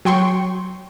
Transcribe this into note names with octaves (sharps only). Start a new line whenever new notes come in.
F#3 G5 C6 C#6